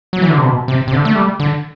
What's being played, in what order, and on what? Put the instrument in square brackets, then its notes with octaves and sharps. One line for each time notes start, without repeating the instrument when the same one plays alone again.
[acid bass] F#3
E3
D3
C3
B2
C3
C3
D3
A3
G3
D3